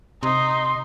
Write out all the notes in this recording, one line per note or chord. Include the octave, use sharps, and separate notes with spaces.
C3 D#4 C6